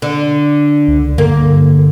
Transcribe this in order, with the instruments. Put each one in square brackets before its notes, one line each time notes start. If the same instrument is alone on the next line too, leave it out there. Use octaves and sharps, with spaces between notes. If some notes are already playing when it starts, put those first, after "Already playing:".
[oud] D3
[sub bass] C#2
[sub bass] G2 [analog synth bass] D3 [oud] A#3